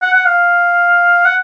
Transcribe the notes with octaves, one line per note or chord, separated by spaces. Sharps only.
F#5
F#5
F5
F#5